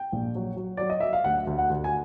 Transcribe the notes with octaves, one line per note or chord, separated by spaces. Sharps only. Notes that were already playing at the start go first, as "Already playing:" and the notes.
Already playing: G5
A#1
F#3
F#3
F#3 D5
D#5
F#3 E5
F5
D2 F#5
D2
F#5
D2
G#5